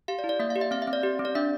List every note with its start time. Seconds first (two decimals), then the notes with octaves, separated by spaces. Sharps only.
0.08 G4 F5
0.19 D5
0.24 E4
0.29 D5
0.40 A#3 E5
0.50 F5
0.56 G4
0.61 E5
0.71 C4 F5
0.82 E5
0.87 C4
0.93 D5
1.03 G4
1.19 C4
1.25 D5
1.35 D4 E5